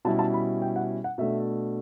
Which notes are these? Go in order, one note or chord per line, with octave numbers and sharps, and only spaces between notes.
B2 G3 C#4 E4 A5
A5
B5
G5
F#5
F#5
B2 A3 D4 E5